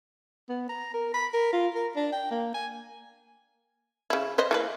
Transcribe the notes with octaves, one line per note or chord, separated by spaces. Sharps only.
B3
A#5
A#4
B5
A#4
F4
A#4
D4
G5
A#3
G#5
C#3 E4
B4 C5 D#5
E3 A#3 B4